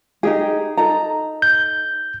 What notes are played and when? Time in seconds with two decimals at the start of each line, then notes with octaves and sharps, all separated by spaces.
0.23 D#4 G4 G#4
0.77 D#4 A4 A#5
1.42 G6